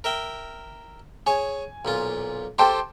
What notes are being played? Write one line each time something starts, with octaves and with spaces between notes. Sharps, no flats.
A#4 E5 G5
G#4 C#5 G#5
B1 A#2 F4
G4 A4 C5 G5 A5 C6